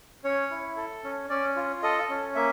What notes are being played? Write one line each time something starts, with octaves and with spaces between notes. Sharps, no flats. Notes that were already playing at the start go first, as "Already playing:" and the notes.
C#4 C#5
E4
A4
C#4
C#4 D5
F4
A4 D#5
C#4
A#3 E5